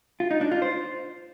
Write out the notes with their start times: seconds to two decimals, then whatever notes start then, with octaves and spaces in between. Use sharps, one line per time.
0.20 F4
0.31 D#4
0.41 D4
0.51 F4
0.62 C5